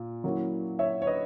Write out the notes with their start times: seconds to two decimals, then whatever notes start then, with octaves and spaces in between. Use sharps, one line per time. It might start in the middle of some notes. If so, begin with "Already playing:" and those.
Already playing: A#2
0.24 F#3 A#3 C#4 E4
0.79 C#5 E5
1.02 C#5
1.07 B4 D#5